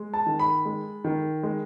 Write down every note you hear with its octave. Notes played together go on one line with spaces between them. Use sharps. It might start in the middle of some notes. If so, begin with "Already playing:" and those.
Already playing: G#3
A5
D#3
B5
G#3
D#3
G#3